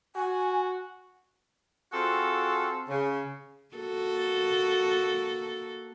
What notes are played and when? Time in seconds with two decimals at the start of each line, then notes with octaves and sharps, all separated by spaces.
0.15 F#4 G#5
1.92 C4 F4 F#4 G#4 A4
2.89 C#3
3.75 A#3 F#4 A4